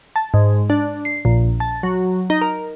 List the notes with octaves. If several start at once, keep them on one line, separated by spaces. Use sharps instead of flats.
A5
G#2
D4
C7
A#1
A5
F#3
D#4
A#4